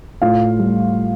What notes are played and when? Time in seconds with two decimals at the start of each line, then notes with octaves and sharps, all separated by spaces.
0.22 A2 F4 F5
0.59 G3